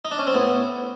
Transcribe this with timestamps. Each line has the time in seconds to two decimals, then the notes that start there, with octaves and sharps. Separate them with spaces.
0.05 D#4
0.11 D4
0.19 C#4
0.27 C4
0.34 A2 B3